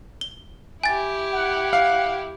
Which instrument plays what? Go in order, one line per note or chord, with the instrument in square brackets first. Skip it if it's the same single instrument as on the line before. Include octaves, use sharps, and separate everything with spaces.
[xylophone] G7
[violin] E4 G4 [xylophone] G#5 A6
[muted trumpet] F#5
[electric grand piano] F5